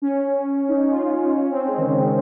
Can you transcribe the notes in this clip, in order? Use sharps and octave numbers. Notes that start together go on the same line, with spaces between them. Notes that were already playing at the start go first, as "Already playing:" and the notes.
C#4
D#4
F4
C#4
C4
G#3
D#3
C#3
D#3
C#3